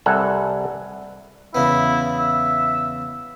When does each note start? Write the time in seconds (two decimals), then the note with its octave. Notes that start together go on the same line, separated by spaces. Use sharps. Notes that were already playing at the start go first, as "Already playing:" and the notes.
0.06 C2 G3 A4 E5 F#5 G#5
1.55 E2 C#3 B3 E4
2.19 E5